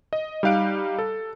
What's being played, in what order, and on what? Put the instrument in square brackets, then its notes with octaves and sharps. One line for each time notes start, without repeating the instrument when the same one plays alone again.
[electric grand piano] D#5
G3 D#4 G4 F5 F#6 D7
A4